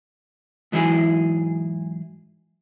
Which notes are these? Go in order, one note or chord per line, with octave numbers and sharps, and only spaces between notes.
G#2 E3 F#3 E4 G#4